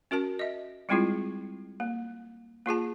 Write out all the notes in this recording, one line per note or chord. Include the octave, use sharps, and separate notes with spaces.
C#4 F#4 A#4 A5
D#5 E5
G3 G#3 C4 E4 F4 G#4
A#3
A#3 F4 G#4 A5